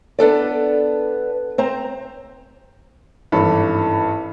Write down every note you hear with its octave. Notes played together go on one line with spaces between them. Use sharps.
B3 D4 A4 D5
C4 C5 A#5
G#1 G2 E3 C#4 A4 B5